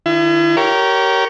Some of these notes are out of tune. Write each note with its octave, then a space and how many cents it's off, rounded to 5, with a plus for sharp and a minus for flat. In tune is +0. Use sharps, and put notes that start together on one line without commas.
D#3 -15 E4 +40
G4 -20 A#4 +0 C#5 +5